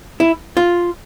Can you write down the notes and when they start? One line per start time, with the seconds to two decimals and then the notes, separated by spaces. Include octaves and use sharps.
0.20 E4
0.57 F4